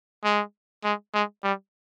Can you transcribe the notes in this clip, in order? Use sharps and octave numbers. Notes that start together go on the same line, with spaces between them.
G#3
G#3
G#3
G3